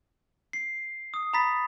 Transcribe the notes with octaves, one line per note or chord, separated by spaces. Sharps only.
C7
D#6
A#5 B5 D#6 A6 B6